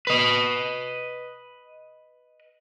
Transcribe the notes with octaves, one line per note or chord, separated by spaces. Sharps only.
B4 D#5